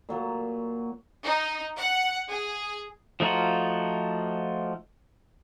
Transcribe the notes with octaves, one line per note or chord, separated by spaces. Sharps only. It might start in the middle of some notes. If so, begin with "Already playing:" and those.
A#2 F#3
D#4
F#5
G#4
F3 A3 D#4 F4 F#4